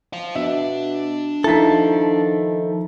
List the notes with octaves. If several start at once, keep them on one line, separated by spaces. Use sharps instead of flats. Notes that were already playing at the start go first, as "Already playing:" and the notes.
C5 F5
B2 D4 E5
D#3 F3 E4 A4 A#5 B6